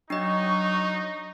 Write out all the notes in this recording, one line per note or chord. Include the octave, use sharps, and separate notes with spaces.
F#3 D4 D#4 D#5 C#6